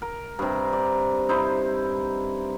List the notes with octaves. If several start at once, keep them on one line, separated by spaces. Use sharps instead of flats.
A#4
G2 C3
D5
D#4 E4 C5